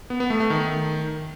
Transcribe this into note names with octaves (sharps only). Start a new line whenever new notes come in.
B3
B3
A3
A3
D#3